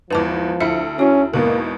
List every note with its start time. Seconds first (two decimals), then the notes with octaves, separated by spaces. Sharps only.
0.10 G#1 E2 F3 B4 A5 D6
0.60 D2 E4 E5 C#7
0.99 C#4 E4 F#4
1.34 G#1 E2 B2 A#3 A#4